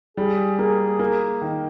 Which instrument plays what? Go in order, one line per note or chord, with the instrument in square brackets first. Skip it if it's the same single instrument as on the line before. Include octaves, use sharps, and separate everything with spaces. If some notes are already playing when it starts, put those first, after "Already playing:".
[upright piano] G3 [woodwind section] G#4
[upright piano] A#3
A#3
D#3